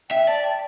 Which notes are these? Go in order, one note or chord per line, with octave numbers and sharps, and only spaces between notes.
E5 G5
D5 A5
G5